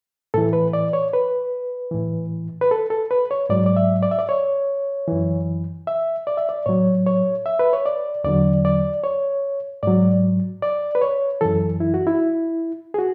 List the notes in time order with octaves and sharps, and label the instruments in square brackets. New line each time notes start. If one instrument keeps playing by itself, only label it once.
[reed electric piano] A2 E3 A4
B4
D5
C#5
B4
A2 E3
B4
A4
A4
B4
C#5
G#2 F#3 D5
D5
E5
D5
E5
D5
C#5
F#2 E3
E5
D5
E5
D5
A2 F#3 C#5
C#5
E5
B4
C#5
D5
E2 D3 F#3 D5
D5
C#5
G#2 F#3 D5
D5
B4
C#5
F#2 E3 A4
E4
F#4
E4
G#4
F#4